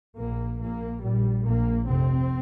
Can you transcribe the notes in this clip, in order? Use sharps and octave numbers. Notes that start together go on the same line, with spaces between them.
A#1 A#2 A#3
A#1 A#2 A#3
A#1 A#2 G3
A#1 A#2 A#3
F1 F2 C3 C4